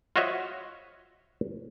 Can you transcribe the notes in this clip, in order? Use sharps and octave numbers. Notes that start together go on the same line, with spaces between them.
F4 F#4 C5 C#5 D#5 E5